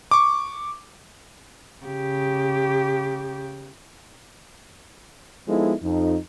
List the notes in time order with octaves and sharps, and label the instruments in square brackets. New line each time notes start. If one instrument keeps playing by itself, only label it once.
[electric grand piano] C#6 D6
[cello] C#3 G4
[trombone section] F3 G#3 B3 D#4 E4 A4
F2 D#4